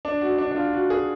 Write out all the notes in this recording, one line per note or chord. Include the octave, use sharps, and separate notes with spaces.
D4
F#4
D4
D4
F4
F#4
G#4